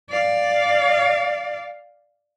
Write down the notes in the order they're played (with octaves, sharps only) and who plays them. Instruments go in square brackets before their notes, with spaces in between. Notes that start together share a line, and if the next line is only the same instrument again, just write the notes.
[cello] D5 F5